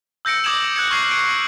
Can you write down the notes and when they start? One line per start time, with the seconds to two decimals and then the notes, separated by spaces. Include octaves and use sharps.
0.25 E6 G6 A#6 C#7 D7
0.44 D6 D#6 G#6 D7 E7 F#7
0.76 F#6 G#6 C#7
0.91 C#6 F6 G#6 C7 F#7
1.11 D7